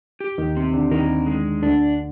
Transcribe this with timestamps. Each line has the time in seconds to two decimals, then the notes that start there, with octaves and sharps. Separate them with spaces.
0.20 G4
0.38 D#2 D#3
0.57 C4
0.74 D3 D4
0.91 D#2 D#3 A#4
1.26 G#3
1.62 D2 D3 D4